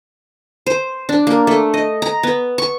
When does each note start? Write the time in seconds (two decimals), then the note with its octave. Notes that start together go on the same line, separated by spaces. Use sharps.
0.66 C5
1.09 D4
1.27 A#3
1.47 A3
1.74 D#5
2.02 A#5
2.23 B3
2.58 C#6